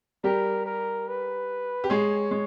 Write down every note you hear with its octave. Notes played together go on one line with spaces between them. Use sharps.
G3 G4 A#4
A#4
B4
G4
G#3 G#4 C#5
G#3